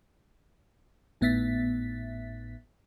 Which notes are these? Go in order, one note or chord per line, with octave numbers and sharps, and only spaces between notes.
G#1 A2 B3 E5 A6 B6